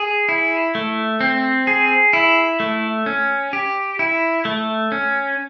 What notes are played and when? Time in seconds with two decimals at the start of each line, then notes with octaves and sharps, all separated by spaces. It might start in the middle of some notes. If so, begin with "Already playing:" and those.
Already playing: G#4
0.29 E4
0.75 A3
1.21 C4
1.67 G#4
2.13 E4
2.60 A3
3.06 C#4
3.53 G4
3.99 E4
4.45 A3
4.92 C#4